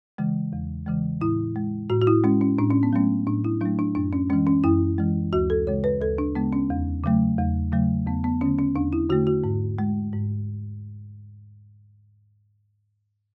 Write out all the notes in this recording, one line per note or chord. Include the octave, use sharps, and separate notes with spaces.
C#3 E3 G#3
E2
C#3 E3 G#3
A2 E4
G#3
A2 F#4
F#4
E4
G#3 C#4
C#4
A2 D4
C#4
B3
F#3 A3 C#4
A2 D4
E4
F#3 A3 D4
D4
F#2 D4
C#4
E3 G#3 C#4
C#4
F#2 E4
E3 G#3
D2 F#4
A4
C#3 G#3 C#5
B4
D2 A4
D4
C#3 G#3 B3
C#4
E2
C#3 F#3 A3
E2
C#3 F#3 A3
E2 B3
B3
D3 A3 C#4
C#4
E2 D4
E4
D3 A3 F#4
F#4
G#2
G#3
G#2